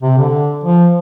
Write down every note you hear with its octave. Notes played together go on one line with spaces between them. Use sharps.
C3
D3
F3